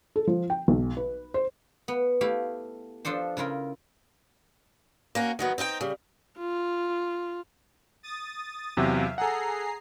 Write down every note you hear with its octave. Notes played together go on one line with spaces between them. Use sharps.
A4
F3
G5
B1
B4
C5
B3
A3 E4 G4 F5
F3 D4 A4 C5
C#3 E4 F4 A#4
A#3 C#4 F#4
D#3 F#3 B3
C4 D#4 E4 G5
C#3 G3
F4
D#6 A6
E2 C3 F#3 E5 F5
G#4 A4 F#5 A#5 C7